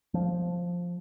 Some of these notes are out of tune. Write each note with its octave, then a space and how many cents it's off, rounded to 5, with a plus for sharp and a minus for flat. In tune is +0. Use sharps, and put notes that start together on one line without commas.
F3 +5